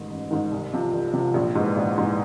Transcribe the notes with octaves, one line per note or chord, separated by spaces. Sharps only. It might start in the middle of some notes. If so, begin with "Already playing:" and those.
Already playing: A1 G#2 D#3
A1
G#2 D#3
C2
C3 F3
C2
C3 F3
A#1
G#2 E3
A#1
G#2 E3